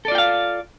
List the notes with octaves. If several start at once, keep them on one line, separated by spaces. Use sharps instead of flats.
F4 A4 D5 F5 G5